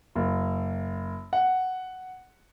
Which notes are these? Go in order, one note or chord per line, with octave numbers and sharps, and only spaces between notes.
F#1
F#5